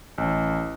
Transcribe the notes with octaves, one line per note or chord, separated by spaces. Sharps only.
A1